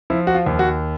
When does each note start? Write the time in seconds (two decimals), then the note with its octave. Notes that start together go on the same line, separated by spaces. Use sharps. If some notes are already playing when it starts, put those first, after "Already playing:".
0.10 F3 E4
0.27 F#4
0.34 F4
0.46 D#2
0.59 F#4